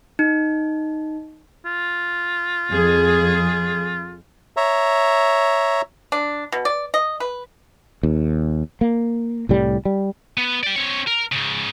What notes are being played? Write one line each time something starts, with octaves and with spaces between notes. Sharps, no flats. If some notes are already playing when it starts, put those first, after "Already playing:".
D#4
F4
F2 G#4
C#5 E5 A#5
D4
B2
D5
D#5
B4
D#2
A#3
C2 A2 G3
G3
B3
D5 G5
C4 C#5
A#4
G#2 C#3